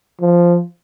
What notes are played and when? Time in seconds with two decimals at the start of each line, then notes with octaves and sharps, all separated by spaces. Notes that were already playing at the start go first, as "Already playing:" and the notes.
0.21 F3